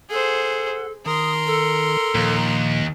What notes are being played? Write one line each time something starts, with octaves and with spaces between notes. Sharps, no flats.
G#4 A4 C5 F#5
D#3 A#4 C6 D#6
A4
D#2 A#2 F3